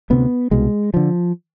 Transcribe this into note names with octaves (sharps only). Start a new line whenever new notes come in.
D2 C3 B3
C2 B2 G#3
D3 F3